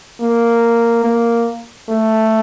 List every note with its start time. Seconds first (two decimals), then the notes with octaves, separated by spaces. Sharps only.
0.21 A#3
1.04 A#3
1.89 A3